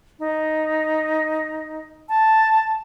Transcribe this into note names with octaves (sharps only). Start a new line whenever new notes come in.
D#4
A5